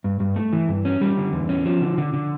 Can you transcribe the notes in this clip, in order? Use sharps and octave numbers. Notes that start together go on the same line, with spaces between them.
G2
G2
A3
E3
G2
C#4
G3
D3
E2
C#4
F3
D3
D3
D3